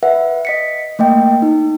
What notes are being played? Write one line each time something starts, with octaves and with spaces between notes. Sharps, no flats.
B4 E5 F#5
D#5 B6 C#7
A3 A#3 D#5 G5
D#4